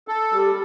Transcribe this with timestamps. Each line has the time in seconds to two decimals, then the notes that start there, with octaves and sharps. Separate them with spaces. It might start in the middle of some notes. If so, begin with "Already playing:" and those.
0.08 A4
0.32 G3